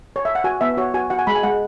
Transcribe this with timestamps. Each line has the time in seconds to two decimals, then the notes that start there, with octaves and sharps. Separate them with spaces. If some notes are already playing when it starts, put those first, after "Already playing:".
0.16 C#5
0.25 E5
0.35 F#5
0.44 F#4 G#5
0.61 B3 E5
0.77 F#4 C#5
0.94 F#4 G#5
1.10 F#4 F#5
1.19 G#5
1.27 G#3 B5
1.35 G#5
1.43 G#3 F#5